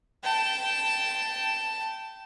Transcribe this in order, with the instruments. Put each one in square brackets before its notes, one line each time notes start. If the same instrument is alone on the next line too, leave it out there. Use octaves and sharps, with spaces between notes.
[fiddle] G5 A5